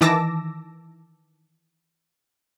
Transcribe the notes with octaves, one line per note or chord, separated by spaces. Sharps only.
D#3 E3 A5 D6 E6 A#6